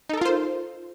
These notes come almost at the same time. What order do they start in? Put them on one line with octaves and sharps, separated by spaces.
D#4 A4 A#4 F4 C5